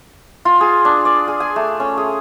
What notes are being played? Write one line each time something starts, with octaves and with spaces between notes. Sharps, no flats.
F4
G#4
D4
D5
G#4
G#5
A3
C#4
G#4